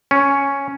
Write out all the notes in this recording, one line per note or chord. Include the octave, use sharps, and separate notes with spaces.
C#4